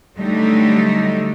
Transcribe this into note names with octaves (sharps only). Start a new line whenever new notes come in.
D3 F#3 G3 A3 D#4